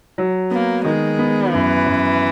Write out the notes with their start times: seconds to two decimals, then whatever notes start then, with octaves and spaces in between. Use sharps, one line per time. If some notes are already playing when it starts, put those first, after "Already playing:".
0.18 F#3
0.51 A#3 B3
0.84 D#3 G#3
1.19 B3
1.52 F#2 E3
1.86 F#2